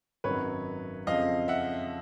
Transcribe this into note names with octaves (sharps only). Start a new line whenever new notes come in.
G#1 F#2 D#3 F#3 B4 C#5
F2 C#3 F3 D#5 F5
E5 F#5